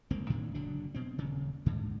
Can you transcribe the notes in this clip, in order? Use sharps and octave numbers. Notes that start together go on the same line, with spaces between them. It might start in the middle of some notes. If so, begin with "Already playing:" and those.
G1 C#2 A#3 C4
A2 D#3 E3 D4
F#1 D3 F#3 D4
B2 C4
D#1 C#3
D2 G#2 D3